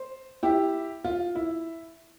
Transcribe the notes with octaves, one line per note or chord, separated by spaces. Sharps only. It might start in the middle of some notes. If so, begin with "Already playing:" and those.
Already playing: C5
E4 G4
F4
E4